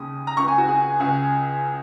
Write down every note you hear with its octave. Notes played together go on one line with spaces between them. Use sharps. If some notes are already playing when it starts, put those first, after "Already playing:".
Already playing: D#2 C#3 D#6
A#5
C#2 C#3 C#6
G#5
F#4
G#4
C#2 C#3 G#4